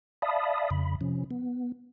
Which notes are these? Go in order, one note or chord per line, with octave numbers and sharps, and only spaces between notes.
D5 E5 F5 A5 B5 D#6
F2 C#3 B5
C3 F3 C#4
B3